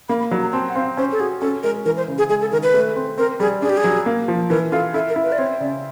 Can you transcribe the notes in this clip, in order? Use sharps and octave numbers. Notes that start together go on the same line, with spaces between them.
A#3 B5
B5
F#3 B5
A#5
C4 A5
F#5
C4 F5
C#4 C5
A4
F#4 G#4
C#4 A4
G#3 A#4
E3 A#4
C5
C#3
G#4
G#3 G#4
A4
D#3 A#4
B4
A3
C4
C4 A#4
G3 G#4
D4 G#4
G4
G#4
F#3
A#3
F3
E3 A#4
F4 A4
E4 A4
A#4
E4
B4
D5
C4 C#5
C#3 D5